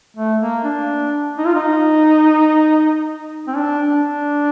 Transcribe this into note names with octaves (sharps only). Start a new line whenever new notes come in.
A3
A#3
D4
D#4
F4
D#4
C4
D4
D4